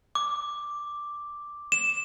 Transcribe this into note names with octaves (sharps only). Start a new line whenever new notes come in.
D6
E7